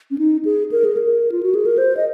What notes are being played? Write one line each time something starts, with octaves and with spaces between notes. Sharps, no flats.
C#4
D#4
G#4
A#4
G#4
A#4
F4
F#4
G#4
A#4
C5
D#5